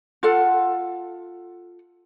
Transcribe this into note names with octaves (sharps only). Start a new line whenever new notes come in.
F4 A4 F#5